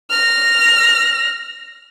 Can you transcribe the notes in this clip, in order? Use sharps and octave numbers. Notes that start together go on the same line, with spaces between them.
F6 A#6